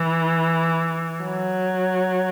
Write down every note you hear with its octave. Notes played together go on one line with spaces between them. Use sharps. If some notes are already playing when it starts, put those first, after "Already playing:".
Already playing: E3
F#3